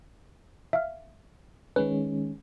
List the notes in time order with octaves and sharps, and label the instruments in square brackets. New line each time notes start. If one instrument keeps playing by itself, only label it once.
[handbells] E5 F5 F6
[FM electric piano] D#3 G#3 C#4 [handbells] B4